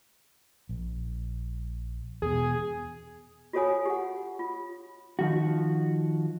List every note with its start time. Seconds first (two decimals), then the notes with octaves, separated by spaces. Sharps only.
0.69 A#1
2.22 E2 B2 G#4
3.53 F4 F#4 A4 C#5 G#5 D#6
3.86 G4 F#5
4.39 F4
5.19 D#3 F3 F#4